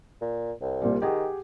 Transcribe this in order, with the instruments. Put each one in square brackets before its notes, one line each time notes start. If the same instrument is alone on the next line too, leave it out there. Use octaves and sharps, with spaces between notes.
[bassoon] A#2
C2
[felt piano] A#2 G3
[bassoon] D#3 [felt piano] G4 G#4 F#5